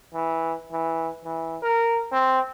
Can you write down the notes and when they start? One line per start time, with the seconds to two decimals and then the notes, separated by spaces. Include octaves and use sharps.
0.14 E3
0.72 E3
1.24 E3
1.63 A#4
2.12 C4